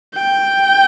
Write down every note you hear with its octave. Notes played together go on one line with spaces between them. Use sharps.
G5